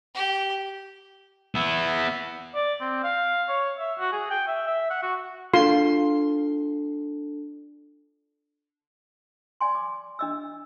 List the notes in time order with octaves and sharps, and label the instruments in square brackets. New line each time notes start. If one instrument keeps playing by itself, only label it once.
[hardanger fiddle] G4
[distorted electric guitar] B3 E4
[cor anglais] D5
C4
F5
C#5
E5
F#4
G#4
G5
E5
E5
F#5
F#4
[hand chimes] D4 A4 [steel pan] F4 C6
[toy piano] D5 G#5 C6
D6
D4 D#5 E6